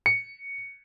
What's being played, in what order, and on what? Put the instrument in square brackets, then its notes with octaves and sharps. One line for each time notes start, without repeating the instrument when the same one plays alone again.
[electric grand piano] C#7